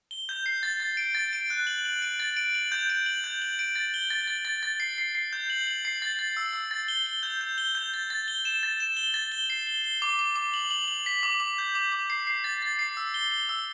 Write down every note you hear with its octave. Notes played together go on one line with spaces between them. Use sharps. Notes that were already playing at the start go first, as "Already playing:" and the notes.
G7
G6
C7
A6
A6
D7
A6
D7
F#6
F#7
F#7
D7
A6
D7
F#7
G6
D7
F#7
G6
F#7
D7
A6
G7
A6
A6
A6
A6
C7
C7
C7
G6
F#7
F#7
C7
A6
A6
E6
E6
A6
G7
G7
G6
G6
G7
G6
A6
A6
G7
E7
A6
E7
G7
A6
G7
C7
G7
G7
D6
D6
D6
F#7
F#7
F#7
B6
D6
D6
G6
D6
D6
C7
C7
A6
A6
C7
E6
G7
G7
E6